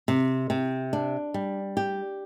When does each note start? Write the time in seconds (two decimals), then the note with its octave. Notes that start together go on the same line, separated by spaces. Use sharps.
0.08 C3
0.50 C3
0.93 D4
1.34 G3
1.77 G4